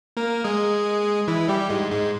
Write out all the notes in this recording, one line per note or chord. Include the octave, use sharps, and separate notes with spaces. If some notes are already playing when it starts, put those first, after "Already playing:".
A#3 A#4
G#3 G#4
E3 E4
G3 G4
G#2 G#3
G#2 G#3